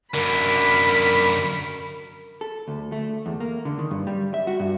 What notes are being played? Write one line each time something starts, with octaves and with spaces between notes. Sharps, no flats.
F#2 D3 A#4 B5
A4
D2
A3
E2
A#3
D3
D#3
G2
G3
E5
F#4
G2